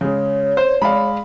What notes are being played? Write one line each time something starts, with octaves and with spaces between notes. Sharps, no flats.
C#3 G#3 C#5
C5
G#3 D5 F5 B5